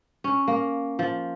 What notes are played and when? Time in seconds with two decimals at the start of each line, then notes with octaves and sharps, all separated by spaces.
0.24 C#4
0.48 A#3
0.99 F3